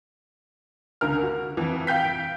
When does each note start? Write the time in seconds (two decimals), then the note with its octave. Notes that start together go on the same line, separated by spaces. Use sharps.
1.01 C#2 D3 A#4 F6
1.23 F#4
1.57 F2 E3
1.87 F5 G5 G6 B6
2.05 D7